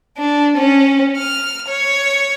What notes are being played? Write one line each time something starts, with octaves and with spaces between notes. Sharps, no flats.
D4
C#4
F6
C#5